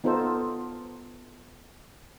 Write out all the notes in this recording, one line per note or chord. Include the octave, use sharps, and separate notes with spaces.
B3 D#4 F4 A4 C5